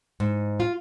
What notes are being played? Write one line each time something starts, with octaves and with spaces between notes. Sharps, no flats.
G#2
F4